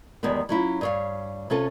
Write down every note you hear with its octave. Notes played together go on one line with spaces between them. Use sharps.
E2 D#3 G3 G#3 B3
F#3 C#4 E4 F4
G2 C#5 F5
C3 C#4 F4 A4